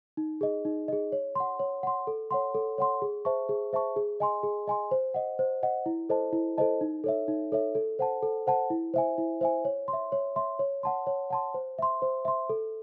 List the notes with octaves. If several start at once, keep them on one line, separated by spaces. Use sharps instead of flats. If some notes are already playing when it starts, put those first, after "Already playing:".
D#4
G#4 D#5
D#4
G#4 D#5
C#5
F#5 C6
C#5
F#5 C6
A4
C#5 F#5 C6
A4
C#5 F#5 C6
G#4
C5 E5 A5 C#6
G#4
C5 E5 A5 C#6
G#4
D#5 G#5 C6
G#4
D#5 G#5 C6
C5
D#5 F#5
C5
D#5 F#5
E4
A4 C5 D#5 A5
E4
A4 C5 D#5 A5
D#4
A4 C#5 E5
D#4
A4 C#5 E5
A4
C5 F#5 A5
A4
C5 F#5 A5
E4
C5 E5 G#5
E4
C5 E5 G#5
C#5
C6
E5
C#5
E5 C6
C#5
F#5 A5 C6
C#5
F#5 A5 C6
C5
E5 C6
C5
E5 C6
A4